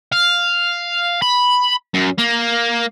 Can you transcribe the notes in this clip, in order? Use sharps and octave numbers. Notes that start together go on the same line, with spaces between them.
F5
B5
F#2
A#3